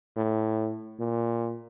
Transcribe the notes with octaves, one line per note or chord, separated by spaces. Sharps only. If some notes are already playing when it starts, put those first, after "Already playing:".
A2
A#2